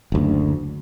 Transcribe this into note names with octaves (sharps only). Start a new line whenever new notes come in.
F#1 D2